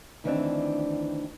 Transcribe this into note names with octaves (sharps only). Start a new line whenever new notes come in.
D2 D#3 E3 B3 C4 D4